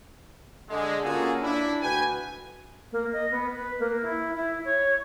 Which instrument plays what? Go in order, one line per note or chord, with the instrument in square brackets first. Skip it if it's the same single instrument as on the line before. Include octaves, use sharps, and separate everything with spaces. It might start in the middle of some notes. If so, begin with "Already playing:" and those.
[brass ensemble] D3 G#3
A#3 C#4 F4 F#4 G#4 A4
D4 E4
D2 F#4 B4 G5 G#5
[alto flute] A#3
D#5
B3
B4
A#3
E4
E4
C#5